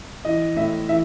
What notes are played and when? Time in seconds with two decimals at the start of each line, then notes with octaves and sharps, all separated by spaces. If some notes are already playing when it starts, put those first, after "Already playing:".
0.25 E3 D#5
0.57 A2 E5
0.89 E3 E5